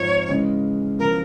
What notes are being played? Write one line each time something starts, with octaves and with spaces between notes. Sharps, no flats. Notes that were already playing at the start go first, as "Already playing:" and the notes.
Already playing: G#2 F3 C4 F4 C#5
C#3 E3 G#3 C#4
E2 C#3 F3 A#4